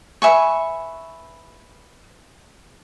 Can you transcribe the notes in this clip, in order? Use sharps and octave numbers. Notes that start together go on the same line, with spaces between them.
B4 E5 G#5 C#6